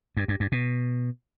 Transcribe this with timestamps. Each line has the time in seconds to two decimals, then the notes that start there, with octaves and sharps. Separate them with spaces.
0.17 G2
0.28 G2
0.40 G2
0.52 B2